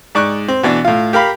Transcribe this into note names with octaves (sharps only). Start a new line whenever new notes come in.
G#2 D5 C#6 D6 F#6
C4
B2 E3 D4
A2 F4
G4 A#4 F5 B5